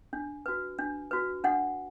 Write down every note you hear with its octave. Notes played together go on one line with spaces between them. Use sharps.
D4
F#4 B4
D4
F#4 B4
D4 F#5